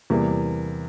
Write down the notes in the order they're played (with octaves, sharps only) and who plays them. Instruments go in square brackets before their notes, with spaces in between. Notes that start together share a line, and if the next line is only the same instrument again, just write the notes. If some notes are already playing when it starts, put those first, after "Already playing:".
[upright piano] E2 C3 G3 A#3